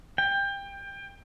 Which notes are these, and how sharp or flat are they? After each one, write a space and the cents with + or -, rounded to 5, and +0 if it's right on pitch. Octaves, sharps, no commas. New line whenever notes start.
G5 +25